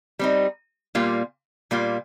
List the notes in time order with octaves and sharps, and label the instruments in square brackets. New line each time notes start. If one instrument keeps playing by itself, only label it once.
[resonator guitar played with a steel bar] G3 C4 D#4
A#2 G3 A#3 F4
A#2 G3 A#3 F4